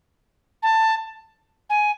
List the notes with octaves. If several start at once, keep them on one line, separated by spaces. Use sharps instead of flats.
A5
G#5